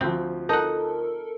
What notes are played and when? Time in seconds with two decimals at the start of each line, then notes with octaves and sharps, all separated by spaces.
0.01 D2 F3 C4
0.49 D#4 A4 A#4 F#5